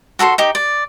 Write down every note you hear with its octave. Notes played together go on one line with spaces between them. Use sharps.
F#4 A4 B5 C6
D#4 G4
D5